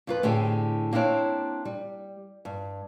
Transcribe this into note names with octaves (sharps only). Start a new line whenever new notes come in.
F2 F4 B4
A2 D3 C4 G4 G#4
A#3 C4 D4 E4 C#5
G3
G2